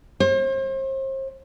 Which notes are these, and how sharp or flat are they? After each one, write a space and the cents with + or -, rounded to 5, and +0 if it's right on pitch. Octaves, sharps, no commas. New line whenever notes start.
C5 +40